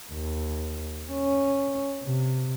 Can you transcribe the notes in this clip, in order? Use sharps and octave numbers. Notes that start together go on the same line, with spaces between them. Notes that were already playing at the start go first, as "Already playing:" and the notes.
D#2
C#4
C3